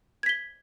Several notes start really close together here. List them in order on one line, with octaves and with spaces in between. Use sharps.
G#6 B6 G7